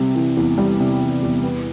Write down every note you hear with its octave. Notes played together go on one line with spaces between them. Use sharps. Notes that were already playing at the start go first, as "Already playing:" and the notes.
Already playing: C3 G3
E3
E2
G3
C3
E3
E2
B3